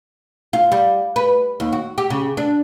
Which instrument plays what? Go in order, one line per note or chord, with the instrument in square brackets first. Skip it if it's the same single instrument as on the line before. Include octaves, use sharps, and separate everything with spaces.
[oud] F4
G3
B4
D#2
F#4
G4
C#3
D4